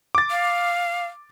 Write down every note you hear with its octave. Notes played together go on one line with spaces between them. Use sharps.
D6 A6
F5